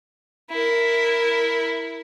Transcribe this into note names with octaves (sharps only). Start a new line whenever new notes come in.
E4 A#4